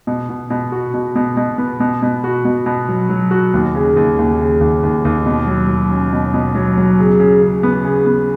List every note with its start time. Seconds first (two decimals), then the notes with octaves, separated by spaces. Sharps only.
0.07 B2
0.30 B2
0.50 B2
0.72 F#4
0.94 B2
1.15 B2
1.37 B2
1.58 B3
1.80 B2
2.02 B2
2.24 F#4
2.45 B2
2.66 B2
2.89 F#3
3.09 F#3
3.31 F#4
3.54 D#2
3.75 C#3
3.96 D#2
4.18 D#2
4.39 C#3
4.60 D#2
4.83 D#2
5.05 D#2
5.26 B2
5.47 F#3
5.68 F#3
5.91 C#4
6.13 B2
6.34 B2
6.55 F#3
6.78 F#3
6.99 C#3
7.20 C#3
7.42 C#3
7.63 B3
7.85 C#3
8.06 B3